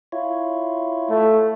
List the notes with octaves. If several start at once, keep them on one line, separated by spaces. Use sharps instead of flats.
E4 F4 C#5
A3